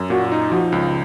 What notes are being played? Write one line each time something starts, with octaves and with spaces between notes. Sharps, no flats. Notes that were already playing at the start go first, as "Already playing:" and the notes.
Already playing: F#2
A#2 F#4
D#4
F3 F#4
C#2